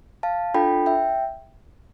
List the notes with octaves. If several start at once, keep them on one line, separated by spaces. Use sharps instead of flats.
F5 A5
D4 F4 A4 G5 B5
E5 G5